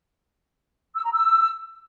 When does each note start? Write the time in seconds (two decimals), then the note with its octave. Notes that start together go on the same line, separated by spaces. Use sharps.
0.95 E6
1.04 A#5
1.12 E6